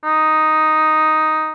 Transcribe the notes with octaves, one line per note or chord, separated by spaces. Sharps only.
D#4